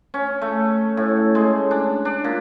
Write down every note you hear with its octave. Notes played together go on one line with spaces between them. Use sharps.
C#4
A3
A2
G#3
D4
D4
A#2